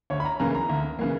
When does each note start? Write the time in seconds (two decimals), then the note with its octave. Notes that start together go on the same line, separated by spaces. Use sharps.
0.10 D2 C#5
0.20 B5
0.25 A#5
0.40 C#3 E3 A#3 A#5
0.55 A#5
0.69 D2
0.99 C#3 E3 A#3